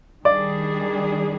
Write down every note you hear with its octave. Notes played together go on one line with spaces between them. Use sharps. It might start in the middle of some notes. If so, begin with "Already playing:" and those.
D#3 G3 D4 G#4 D5